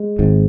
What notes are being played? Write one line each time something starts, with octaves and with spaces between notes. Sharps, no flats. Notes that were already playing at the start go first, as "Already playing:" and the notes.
Already playing: G#3
G#1 G#2